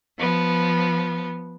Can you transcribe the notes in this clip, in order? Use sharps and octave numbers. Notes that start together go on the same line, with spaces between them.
F3 B3